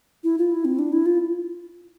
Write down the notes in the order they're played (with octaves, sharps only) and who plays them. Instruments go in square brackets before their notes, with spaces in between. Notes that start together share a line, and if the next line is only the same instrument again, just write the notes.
[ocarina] E4
F4
E4
C4
D4
E4
F4